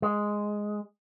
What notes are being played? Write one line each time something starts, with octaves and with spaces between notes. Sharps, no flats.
G#3